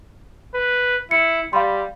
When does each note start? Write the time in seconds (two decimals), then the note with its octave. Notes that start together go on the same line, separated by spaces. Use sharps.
0.54 B4
1.11 E4 C#7
1.53 G3 F5 B5 C6